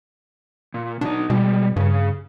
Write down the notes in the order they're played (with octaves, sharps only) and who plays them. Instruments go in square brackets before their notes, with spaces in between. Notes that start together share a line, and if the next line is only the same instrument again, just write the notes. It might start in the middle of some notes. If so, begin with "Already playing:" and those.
[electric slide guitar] A#2
[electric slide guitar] B2 D#4 [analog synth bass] D4
[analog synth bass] B2 [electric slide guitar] G3 G#3
[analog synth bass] G2 [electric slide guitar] C#3 G#4